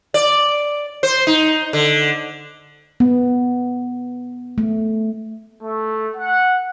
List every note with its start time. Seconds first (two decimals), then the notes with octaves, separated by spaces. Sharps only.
0.14 D5
1.03 C5
1.27 D#4
1.73 D3
3.00 B3
4.58 A3
5.63 A3
6.16 F#5